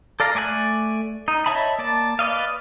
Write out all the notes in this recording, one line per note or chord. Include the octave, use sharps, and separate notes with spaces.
A4 D5 F5 A#5
A3 D5 G#5 B5 F#6
D#4
C#5 D#5 E5 A5 B5
A#3 D5 A5
B4 D5 D#5 F5